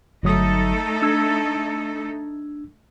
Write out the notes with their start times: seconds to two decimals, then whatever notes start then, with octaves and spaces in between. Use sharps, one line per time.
0.23 G1 F#3 A3 D#4 A4 D#6
1.02 D4 E6 G#6